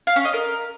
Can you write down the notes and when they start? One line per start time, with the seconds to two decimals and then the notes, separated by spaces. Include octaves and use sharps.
0.07 F5
0.16 C#4
0.25 D#5
0.34 A#4